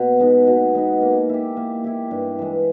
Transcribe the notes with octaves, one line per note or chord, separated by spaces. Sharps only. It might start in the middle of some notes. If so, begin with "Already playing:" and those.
Already playing: B2
G#3 B3 D#4
B2
G#3 B3 D#4
A#3
E4 G4
A#3
E4 G4
G2
E3 G#3